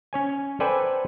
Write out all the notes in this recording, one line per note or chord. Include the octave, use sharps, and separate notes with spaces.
C#4 C#5 G#5
A4 B4 C5 D5 G5 G#5